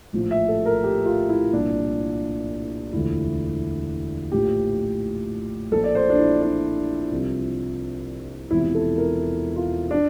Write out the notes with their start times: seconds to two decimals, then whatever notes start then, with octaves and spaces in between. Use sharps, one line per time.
0.13 A#1 A2 F3
0.31 E5
0.48 A4
0.66 A#4
0.84 G4
1.06 F4
1.29 E4
1.53 C2 A#2 F3 D4
2.93 E1 D2 D3 F3 E4
4.32 A#1 A2 F3 G4
5.71 A#1 A#2 F3 A4
5.84 D5
5.95 C5
6.10 D4
6.18 E4
6.42 D4
7.11 C2 C3 F3
8.51 E1 E2 C3 F3 E4
8.75 A4
8.97 A#4
9.56 F4
9.91 D4